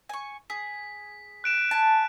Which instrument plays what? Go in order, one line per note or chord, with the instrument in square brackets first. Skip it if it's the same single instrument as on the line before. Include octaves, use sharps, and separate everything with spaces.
[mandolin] G#5 C#6
[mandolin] G#4 [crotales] B6
[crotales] F#6 D7 E7
[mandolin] G#5 A5